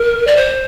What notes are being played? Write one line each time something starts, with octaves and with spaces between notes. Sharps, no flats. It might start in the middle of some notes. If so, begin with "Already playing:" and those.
Already playing: A#4
D5
C5